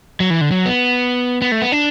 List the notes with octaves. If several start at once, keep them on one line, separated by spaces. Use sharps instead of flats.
F#3
E3
D3
F#3
B3
B3
A3
B3
D4